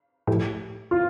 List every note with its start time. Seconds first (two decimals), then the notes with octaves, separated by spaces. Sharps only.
0.27 A2 F3 A3 E4 G4
0.91 F4